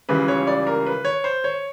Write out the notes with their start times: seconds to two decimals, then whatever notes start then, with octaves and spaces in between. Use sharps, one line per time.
0.09 C#2 C#3 E3 G3 B4
0.28 C#5
0.47 D5
0.67 A#4
0.86 B4
1.05 C#5
1.24 C5
1.44 C#5